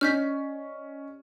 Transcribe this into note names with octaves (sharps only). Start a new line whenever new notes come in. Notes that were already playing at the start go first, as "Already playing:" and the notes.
C#4 G4 D5 D#5 F6 G6 B6